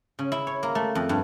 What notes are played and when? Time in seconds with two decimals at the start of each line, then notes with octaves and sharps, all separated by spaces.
0.19 C#3
0.32 E4
0.47 C#5
0.63 A#3
0.75 A3
0.95 F2
1.09 G2